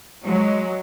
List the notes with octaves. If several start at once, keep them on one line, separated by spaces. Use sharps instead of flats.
F#3 G#3